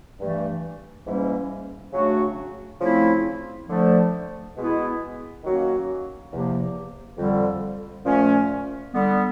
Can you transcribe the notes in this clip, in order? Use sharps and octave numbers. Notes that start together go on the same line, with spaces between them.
G2 E3 A3
G#2 E3 G3 A#3 C#4
C#3 F#3 A3 D4 F#4
C#3 F3 A3 C4 E4
D3 F3 A3
B2 G#3 B3 E4
D#3 F#3 A#3 C#4 F#4
E2 C3 F3 A#3
F2 D3 G3
A#2 F3 A3 C#4
D3 G3 B3